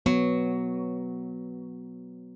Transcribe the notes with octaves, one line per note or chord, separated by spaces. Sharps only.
F#3 B3